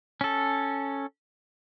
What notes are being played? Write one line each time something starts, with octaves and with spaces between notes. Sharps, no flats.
C#4 A4